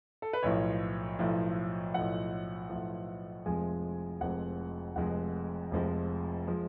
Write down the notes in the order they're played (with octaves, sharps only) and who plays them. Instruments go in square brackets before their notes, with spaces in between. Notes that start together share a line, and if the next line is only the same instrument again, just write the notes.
[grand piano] A4
B4
B1 A2 F3 C#5
B1 A2 F3
B1 A2 F3 F#5
B1 A2 F3
F1 F2 F3 G#3 G#5
F1 F2 F3 G#3 F#5
F1 F2 F3 G#3 F#5
F1 F2 F3 G#3
F3 G#3